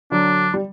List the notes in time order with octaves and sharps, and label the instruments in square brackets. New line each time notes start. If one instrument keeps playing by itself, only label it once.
[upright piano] D3 F#3 [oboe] D4
[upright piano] G3